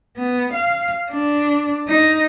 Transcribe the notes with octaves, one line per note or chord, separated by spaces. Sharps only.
B3
F5
D4
D#4